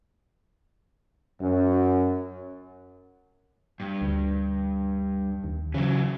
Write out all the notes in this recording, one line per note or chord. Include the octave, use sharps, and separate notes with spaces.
F#2
G2
D2
D#2
C#3 E3 F#3